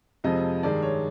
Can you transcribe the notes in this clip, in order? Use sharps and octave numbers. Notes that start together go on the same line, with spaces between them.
F2 C3 F3 G#3 D#5
G2 D#3 G#3 D5
C#5